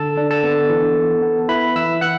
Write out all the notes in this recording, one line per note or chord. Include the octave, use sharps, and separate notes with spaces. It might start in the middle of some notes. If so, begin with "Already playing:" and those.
Already playing: D3 A4 A5
D4
A4 A5
B3
E3
B3
B3
E4 B4 B5
E3 E5 E6
E3 F#5 F#6